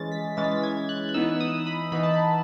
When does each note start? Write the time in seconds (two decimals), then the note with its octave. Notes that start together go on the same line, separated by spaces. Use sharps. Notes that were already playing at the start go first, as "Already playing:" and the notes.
Already playing: E3 G#3 C#4 A6
0.12 B6
0.37 E3 G#3 C#4 A6
0.44 B6
0.52 A6
0.63 G#6
0.89 F#6
1.09 F#6
1.14 E3 B3 D#4 E6
1.40 D#6
1.66 B5
1.92 E3 B3 D#4 B5
2.03 A5
2.14 B5